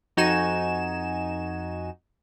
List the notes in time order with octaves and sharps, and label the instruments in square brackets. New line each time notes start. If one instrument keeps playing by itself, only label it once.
[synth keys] F2 D#4 F#4 G#5 E7